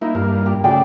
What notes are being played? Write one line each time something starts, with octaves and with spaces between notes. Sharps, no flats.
A#3 D#4 E4
G2 A#3 A#4
G4
C#3 A3 F#4 G#4 D5 G5